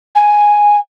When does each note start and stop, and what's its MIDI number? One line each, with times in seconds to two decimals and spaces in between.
0.15 0.76 80